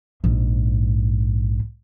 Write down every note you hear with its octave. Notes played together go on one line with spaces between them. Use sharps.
A#1 G#2